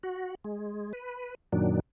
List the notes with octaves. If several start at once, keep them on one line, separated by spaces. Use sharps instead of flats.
F#4
G#3
B4
F#2 A#2 D#3 F#3 D4